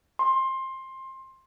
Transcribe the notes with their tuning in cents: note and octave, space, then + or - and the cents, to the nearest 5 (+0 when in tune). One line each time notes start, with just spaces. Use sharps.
C6 +20